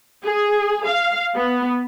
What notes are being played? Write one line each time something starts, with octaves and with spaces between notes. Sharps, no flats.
G#4
F5
B3